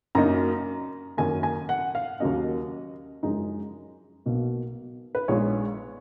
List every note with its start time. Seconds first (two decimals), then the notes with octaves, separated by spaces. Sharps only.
0.15 F#2 C#3 F#3 A#3 D#4 A#5
1.17 F#2 D#3 A#3 G#5
1.43 G#5
1.69 F#5
1.95 F5
2.20 D#2 C#3 F#3 A#3 C#4 D#5
3.23 F#2 C#3 F3 G#3 D#4
4.26 B1 B2 A#3
5.15 B4
5.28 A#1 A#2 G#3 B3 D#4 C#5